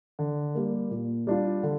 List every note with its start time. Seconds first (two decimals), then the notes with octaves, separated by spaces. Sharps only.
0.19 D3
0.55 G3 A#3
0.91 A#2
1.27 G3 D4 F4
1.63 D3